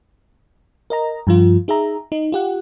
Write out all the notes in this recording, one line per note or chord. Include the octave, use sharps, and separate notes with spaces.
A#4 D#5 A#5
G2 F3 F4
D#4 G#4 E5 A#5
D#4
F4 G4 F#5